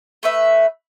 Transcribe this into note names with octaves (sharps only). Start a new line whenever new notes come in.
A3 B4 E5